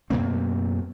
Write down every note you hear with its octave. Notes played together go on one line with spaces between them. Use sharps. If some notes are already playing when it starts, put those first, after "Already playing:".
F#2 B2 A#3 C4